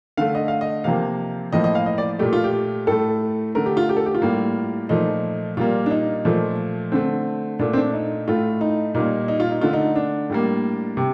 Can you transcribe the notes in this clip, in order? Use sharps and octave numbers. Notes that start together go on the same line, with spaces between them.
D3 A3 F5
D#5
F5
D#5
C3 F3 A#3 F5
A2 F3 A#3 D#5
D#5
F5
D#5
D5
A#2 A3 G4
F4
G4
A2 A3 A4
D3 A3 A#4
G4
F4
G4
A4
G4
F4
A2 G3 A#3
A#2 F3 A3 D#4
A#2 G3 A#3 F4
D4
D#4
A#2 F3 A3
D3 A3 C4
A#2 A3 D4
C4
D4
D#4
A2 A3 F4
D#4
A#2 G3 A#3 D#4
D#4
F4
D#4
D3 A3 F4
D#4
D4
A2 G3 A#3
C3